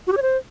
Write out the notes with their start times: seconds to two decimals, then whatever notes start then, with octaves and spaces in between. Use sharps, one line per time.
0.07 F#4
0.12 G4
0.17 C#5
0.22 C5